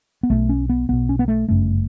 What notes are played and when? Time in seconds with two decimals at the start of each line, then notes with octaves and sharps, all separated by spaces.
0.23 B3
0.30 B1 B2 A3
0.49 C#4
0.69 B3
0.89 B1 B2 B3
1.09 C#4
1.19 B3
1.28 A3
1.48 G1 F#2 C#3 A3